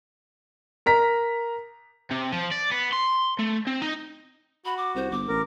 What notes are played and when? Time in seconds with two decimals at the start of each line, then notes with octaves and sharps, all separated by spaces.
0.86 A#4 A#5 B6
2.11 C3
2.32 F3
2.52 D5
2.71 B3
2.92 C6
3.39 A3
3.67 C4
3.82 D#4
4.65 F#4 B5
4.77 D6
4.96 C2 C5
5.11 G1 D6
5.28 A1 A#4